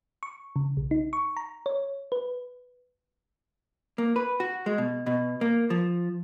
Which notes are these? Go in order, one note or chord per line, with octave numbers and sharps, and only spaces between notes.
C#6
C#3
B1
D#4
C#6
A#5
C#5
B4
A#3
B4
F#4
G#3
B2
B2
A#3
F3